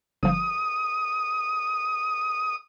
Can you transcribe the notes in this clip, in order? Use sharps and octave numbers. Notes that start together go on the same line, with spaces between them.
G1 F3 D#6